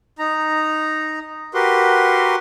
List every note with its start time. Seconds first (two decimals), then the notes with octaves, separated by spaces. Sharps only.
0.19 D#4 A#5
1.54 F#4 G4 A#4 B4 C6